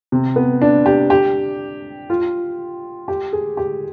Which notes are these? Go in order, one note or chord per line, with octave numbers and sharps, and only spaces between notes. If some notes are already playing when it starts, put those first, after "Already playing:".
C3
B3
D4
G4
G4
F4
G4
G#4
G4